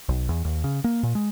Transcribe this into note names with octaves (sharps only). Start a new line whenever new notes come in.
B1
E2
D#2
C#3
A#3
A#2
G#3